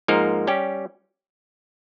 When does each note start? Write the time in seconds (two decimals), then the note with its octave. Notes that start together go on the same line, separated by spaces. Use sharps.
0.08 G#2 F3 A#3 D#4 A#4
0.47 G3 C#4 G4